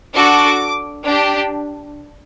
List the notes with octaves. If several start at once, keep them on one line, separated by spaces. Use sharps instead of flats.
D4 F#4 A4 D6
D4 G4